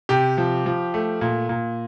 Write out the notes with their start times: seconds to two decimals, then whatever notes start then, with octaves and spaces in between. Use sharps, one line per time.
0.09 C3 G4
0.38 F3
0.66 F3
0.94 A3
1.21 A#2
1.49 A#2